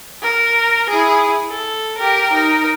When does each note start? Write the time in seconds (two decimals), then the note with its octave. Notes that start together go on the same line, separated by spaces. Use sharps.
0.22 A#4
0.89 E4 G#4
1.49 A4
1.98 G4 A#4
2.33 D#4 A#4